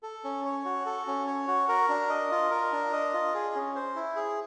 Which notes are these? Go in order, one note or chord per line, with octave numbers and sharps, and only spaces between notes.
A4
C#4
C#5
F#4
A4
C#4
C#5
F#4
A#4
D4
D#5
F4
A#4
D4
D#5
F4
G#4
C#4
C5
E4
G#4